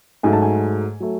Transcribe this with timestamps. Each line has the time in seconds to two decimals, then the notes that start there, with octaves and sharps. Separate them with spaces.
0.23 G#2 F#3 A3 G#5
0.33 A5
0.42 G#5
1.00 F#3 A3